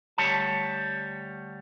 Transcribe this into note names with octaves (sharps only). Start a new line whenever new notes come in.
D2 G3 C#5 A5